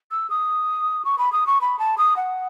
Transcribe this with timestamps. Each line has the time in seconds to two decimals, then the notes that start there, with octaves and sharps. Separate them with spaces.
0.11 E6
0.30 D#6
1.05 C#6
1.18 B5
1.32 D#6
1.47 C#6
1.61 B5
1.79 A5
1.98 D#6
2.17 F#5